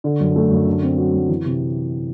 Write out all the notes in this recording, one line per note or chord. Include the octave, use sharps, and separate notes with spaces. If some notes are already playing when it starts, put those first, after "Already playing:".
D3
F#2
A3
F#2
D3
C4
F#3
F#2
E3
C3